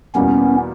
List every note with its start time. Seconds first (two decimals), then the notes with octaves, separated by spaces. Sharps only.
0.15 E2 B2 G3 A#3 B3 C#4